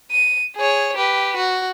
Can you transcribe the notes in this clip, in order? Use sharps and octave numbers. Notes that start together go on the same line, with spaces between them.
D#7
G#4 C#5
G4 B4
F#4